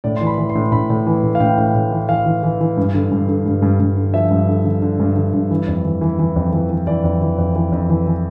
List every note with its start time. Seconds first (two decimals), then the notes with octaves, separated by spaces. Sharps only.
0.04 A2 D5
0.17 E3 C6
0.27 B5
0.38 E3
0.49 C6
0.55 A2
0.72 A2 B5
0.90 A2
1.06 E3
1.23 A2
1.35 F5
1.40 A2 G5
1.58 A2
1.75 A2
1.92 E3
2.09 E3 F5
2.26 E3
2.43 E3
2.60 E3
2.77 G2
2.94 D3
3.11 G2
3.28 D3
3.46 G2
3.62 G2
3.80 G2
3.97 D3
4.14 F3 E5
4.31 G2
4.48 D3
4.65 D3
4.82 D3
4.99 G2
5.16 D3
5.33 G2
5.51 E3
5.68 F2
5.85 E3
6.01 E3
6.19 E3
6.36 F2
6.53 E3
6.70 E3
6.87 E3 D5
7.04 F2
7.21 E3
7.38 F2
7.55 E3
7.72 F2
7.90 E3
8.07 E3